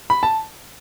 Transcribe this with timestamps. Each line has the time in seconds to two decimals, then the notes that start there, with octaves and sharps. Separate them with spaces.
0.10 B5
0.23 A5